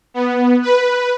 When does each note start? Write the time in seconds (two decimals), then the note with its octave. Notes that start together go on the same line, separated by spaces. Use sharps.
0.14 B3
0.62 B4